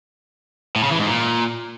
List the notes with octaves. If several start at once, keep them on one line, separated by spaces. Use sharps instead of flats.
A2
C#3
E3
G#2
A#2